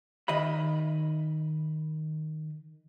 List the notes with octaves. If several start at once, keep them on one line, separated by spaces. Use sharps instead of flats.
D#3 D#5 E5 B5